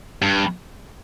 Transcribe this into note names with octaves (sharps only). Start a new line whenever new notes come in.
G2